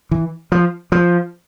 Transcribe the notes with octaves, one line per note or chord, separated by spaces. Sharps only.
E3
F3
F3